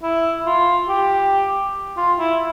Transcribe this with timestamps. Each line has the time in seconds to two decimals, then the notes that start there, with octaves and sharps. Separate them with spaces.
0.03 E4
0.46 F4
0.89 G4
1.97 F4
2.19 E4